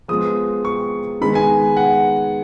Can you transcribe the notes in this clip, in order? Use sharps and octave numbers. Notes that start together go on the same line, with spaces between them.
F3 G#3 B3 D#6
C#6
D#3 G#3 B3 B5
G#5
F#5